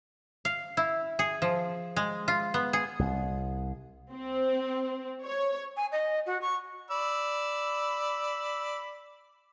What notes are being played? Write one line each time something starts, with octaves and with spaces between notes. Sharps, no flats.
F5
E4
G#4
F3
G#3
F4
B3
G#4
C2
C4
C#5
G#5
D#5
F#4
C#6
D5 B5 E6